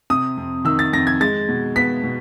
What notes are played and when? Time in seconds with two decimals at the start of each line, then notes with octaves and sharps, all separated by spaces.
0.10 C3 D#6
0.37 F2
0.65 D#3 E6
0.79 A6
0.93 F2 A#6
1.07 G#6
1.20 G#3 A6
1.48 B2
1.76 B3 B6
2.03 B2